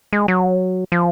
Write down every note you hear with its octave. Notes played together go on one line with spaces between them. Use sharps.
G#3
F#3
F3